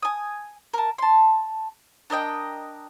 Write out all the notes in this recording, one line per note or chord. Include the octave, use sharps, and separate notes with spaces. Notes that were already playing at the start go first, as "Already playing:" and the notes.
G#5 D#6
A#4 A5
A5 C6
D4 A#4 D#5 G5